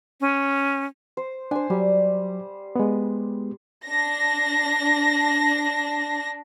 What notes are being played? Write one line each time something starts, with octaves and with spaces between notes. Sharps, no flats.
C#4
C5
D4 C5 G#5
F#3 G3
G#3 B3
D4 A#6